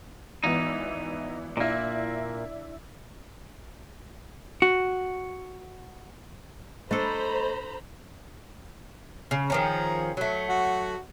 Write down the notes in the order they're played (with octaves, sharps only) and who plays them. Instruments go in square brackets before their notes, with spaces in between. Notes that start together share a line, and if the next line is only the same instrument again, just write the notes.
[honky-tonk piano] G#1 E3 B3 [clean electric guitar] D#4
[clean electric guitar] A#2 A#3 [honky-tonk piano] D4 E4
[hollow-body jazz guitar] F#4
[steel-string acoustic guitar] A3 D#5 [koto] D4 A4 [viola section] C5 A#5 B5
[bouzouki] C#3
[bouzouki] D#3 F3 C#4 [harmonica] G#4 A#5
[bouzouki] F#3 A3
[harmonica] F#4 F#5